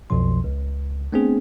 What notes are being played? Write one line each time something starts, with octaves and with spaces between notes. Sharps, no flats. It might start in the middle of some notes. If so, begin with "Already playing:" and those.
B1 F2 B2 F3 C6
C#2
A3 B3 C4 D4 G#4